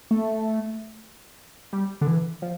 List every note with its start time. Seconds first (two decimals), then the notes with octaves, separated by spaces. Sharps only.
0.11 A3
1.73 G3
2.01 D3
2.07 E3
2.42 F3